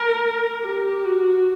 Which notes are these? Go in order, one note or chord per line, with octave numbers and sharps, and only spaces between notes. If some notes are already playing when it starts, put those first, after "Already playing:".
Already playing: A#4
G4
F#4